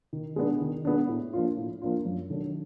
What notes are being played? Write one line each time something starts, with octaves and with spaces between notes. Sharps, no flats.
D#3
G#3 B3 D4
D#3
G#3 B3 D4
A2
F3 A#3 D4 F4
A2
F3 A#3 D4 F4
F#2
D#3 F#3 A3 D4